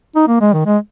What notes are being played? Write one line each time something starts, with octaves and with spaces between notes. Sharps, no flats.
D#4
A#3
G#3
D#3
G#3